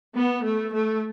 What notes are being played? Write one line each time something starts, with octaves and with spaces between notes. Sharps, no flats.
B3
A3
A3